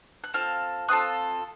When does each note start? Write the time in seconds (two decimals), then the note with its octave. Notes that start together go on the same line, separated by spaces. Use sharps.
0.24 F#6
0.34 C4 F4 A4 F6
0.89 C4 F4 A4 D#6 F#6